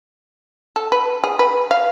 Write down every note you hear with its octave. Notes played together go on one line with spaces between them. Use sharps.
A4
B4
G#4
B4
F5